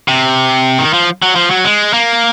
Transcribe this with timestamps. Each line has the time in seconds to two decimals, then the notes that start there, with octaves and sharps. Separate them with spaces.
0.08 C3
0.79 D#3
0.94 F3
1.22 F#3
1.36 F3
1.51 F#3
1.65 G#3
1.93 A#3